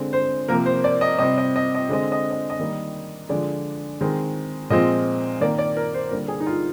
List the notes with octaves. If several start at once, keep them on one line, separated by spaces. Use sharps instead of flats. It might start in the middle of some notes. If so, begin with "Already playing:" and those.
Already playing: D3 G#3 C4
C5
C3 F3 A#3 A#4
C5
D5
D#5
C3 G3 C4 D#5
D#5
D#5
D#5
D3 G#3 C4 D#5
D#5
D#5
D#5
D#3 G3 A#3
D3 F3 G#3 D5
D#3 G#3 C4
A#2 F3 G#3 C4 D#5
D#3 A#3 D5
D5
A#4
C5
D3 G3 A#3 A#4
G#4
D#4
F4